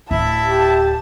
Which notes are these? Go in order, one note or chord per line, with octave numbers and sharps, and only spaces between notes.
D1 E4 E5 A5
G4